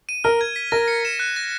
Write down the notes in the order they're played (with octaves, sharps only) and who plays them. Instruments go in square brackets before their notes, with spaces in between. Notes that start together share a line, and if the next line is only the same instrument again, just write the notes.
[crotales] D#7
[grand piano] A#4 [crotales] F6
[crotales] G#6
B6
[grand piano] A#4 [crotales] A#6
[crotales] C#7
E7
F#6
A#6